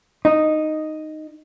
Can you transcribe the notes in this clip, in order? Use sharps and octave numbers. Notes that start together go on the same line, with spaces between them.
D#4